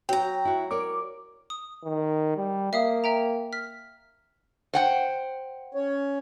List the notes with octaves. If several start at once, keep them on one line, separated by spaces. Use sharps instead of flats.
F#3 G5 A#5
E4 F#4
A#4 C#5 D5 D6
D#6
D#3
G3
A#3 E5 F5 D#6
E5 G5 A#5
F6 B6
C5 F#5 G5
C#4 C#5